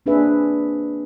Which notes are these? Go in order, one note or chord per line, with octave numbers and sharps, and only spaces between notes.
A#3 C4 D4 G#4 B4 E5